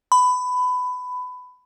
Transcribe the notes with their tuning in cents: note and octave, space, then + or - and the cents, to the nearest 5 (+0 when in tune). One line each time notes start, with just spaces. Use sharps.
B5 +20